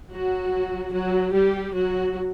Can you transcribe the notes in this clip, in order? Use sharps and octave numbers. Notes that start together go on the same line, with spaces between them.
F#3 F#4
F#3 F#4
G3 G4
F#3 F#4